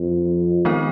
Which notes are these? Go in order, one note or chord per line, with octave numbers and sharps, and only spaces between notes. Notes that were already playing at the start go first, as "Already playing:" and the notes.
Already playing: F2
D#3 G#3 B3 D#4 A#4